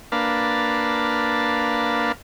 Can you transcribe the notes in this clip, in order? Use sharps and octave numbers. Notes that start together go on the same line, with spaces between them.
A#3 D4 B4 F5 A5